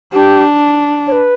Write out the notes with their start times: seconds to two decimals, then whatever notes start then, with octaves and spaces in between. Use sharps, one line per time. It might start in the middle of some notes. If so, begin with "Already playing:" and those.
0.13 D4 G4
1.07 C#5
1.12 B4